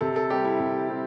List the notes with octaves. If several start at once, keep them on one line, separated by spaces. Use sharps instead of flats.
C3 A4
A4
G3 C4 G4
E4
C3
G3 C4